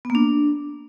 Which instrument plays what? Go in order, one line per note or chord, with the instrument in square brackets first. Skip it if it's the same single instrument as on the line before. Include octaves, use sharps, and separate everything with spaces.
[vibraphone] B3
A#3
D4